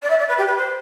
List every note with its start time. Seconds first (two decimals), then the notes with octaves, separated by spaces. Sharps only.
0.02 D5
0.10 E5
0.19 D5
0.28 B4
0.38 G4
0.47 B4
0.57 C5